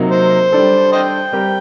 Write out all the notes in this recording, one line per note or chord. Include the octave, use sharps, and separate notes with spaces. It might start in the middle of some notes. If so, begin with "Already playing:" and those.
Already playing: C3 F#3 A#3 D#4
C5
G3 D4 A4
C5 D#5 G5
G3 C4 G4 A#4